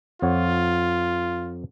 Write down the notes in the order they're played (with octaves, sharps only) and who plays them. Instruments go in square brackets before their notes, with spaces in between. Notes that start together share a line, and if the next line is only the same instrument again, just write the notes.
[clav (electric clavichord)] F2 C#5 F#5 [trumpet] F4